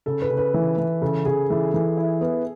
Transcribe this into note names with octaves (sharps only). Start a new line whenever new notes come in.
C#3 A4
B4
C#3
B4
E3
E3
C#3 A4
C#3 G#4
E3 A4
E3 A4
E4
B3